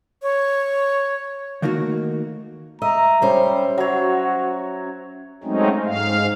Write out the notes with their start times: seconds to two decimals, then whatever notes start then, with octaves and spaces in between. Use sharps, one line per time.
0.22 C#5
1.62 D#3 A3 A#3 D#4 F#4
2.82 D#5 E5 A#5
3.22 G3 C#4 C5
3.78 F#3 F#4 C#5
5.44 F#3 G#3 A3 C4 C#4 D#4
5.85 G#2 F5